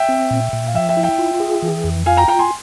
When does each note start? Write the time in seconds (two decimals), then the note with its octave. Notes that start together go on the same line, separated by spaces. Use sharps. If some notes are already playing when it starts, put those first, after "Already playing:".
Already playing: E5 G5
0.09 C4
0.31 A#2
0.53 A#2
0.67 F5
0.74 F3 E5 G5
0.89 E5 G5
0.97 E4
1.03 E5 G5
1.18 F4
1.40 G#4
1.62 E3
1.84 F2
2.06 F4 F5 G#5
2.17 G5 A#5
2.28 F4 G5 A#5
2.39 G#5 C6